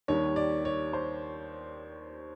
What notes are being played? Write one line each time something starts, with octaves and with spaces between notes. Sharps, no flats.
D#2 D#3 G3 C#5
D5
C#5
C5